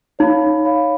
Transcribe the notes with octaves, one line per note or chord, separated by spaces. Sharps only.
D#4 C#5 F5 B5
C#5 F5 B5